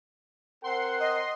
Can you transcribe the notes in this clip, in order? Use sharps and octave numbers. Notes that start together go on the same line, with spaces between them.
C4 A#4 F#5 C6
D#5 C6